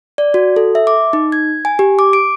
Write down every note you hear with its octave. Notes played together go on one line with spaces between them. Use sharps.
D5
F#4
A4
E5
D6
D#4
G#6
G#5
G4
D6
D7